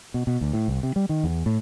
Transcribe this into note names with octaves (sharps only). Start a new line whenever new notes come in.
B2
B2
D2
A2
C2
C3
G3
D#3
E2
A2